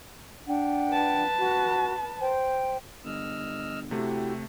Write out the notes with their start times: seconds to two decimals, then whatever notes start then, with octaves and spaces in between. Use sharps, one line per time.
0.47 D4 F#5 G5
0.90 B4 A5
1.38 F#4
2.20 C5 G5
3.05 G1 D#5 E6 F6
3.91 C3 A3 E4 F#4 G4